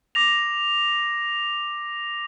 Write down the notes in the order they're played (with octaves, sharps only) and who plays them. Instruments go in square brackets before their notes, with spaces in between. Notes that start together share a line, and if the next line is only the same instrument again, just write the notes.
[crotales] D6 A#6 F7